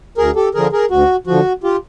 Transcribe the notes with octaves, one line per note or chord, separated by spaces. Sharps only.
D2 G#4 A#4
G4 A4
D3 F3 G#4 A#4
G#4 A#4
D2 F#4
D3 F3 F#4
F4 G4